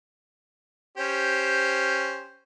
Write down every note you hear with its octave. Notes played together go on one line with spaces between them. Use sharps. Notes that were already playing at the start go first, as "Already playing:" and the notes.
C#4 G4 C5